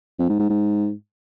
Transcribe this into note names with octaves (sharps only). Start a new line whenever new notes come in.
F2
G#2
G#2
G#2